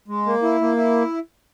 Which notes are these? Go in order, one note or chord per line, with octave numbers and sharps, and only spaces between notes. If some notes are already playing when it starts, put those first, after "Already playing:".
G#3
A#3
E4
A#3
E4